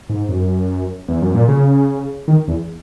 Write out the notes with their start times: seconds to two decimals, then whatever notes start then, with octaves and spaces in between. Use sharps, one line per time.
0.09 G#2
0.29 F#2
1.08 E2
1.22 F#2
1.34 A#2
1.48 C#3
2.28 D#3
2.48 E2